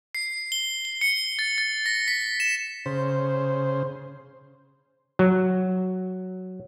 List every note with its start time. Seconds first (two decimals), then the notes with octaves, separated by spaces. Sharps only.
0.15 C7
0.52 G7
0.85 G7
1.01 C#7
1.39 A6
1.58 A6
1.86 A#6
2.08 B6
2.40 E7
2.86 C#3 C5
5.19 F#3